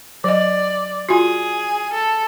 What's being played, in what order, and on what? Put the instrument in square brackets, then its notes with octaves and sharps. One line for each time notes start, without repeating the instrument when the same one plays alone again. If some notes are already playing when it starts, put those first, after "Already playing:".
[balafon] F#3 D#5 [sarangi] D5
[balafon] F4 F#4 [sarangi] G#4
[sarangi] A4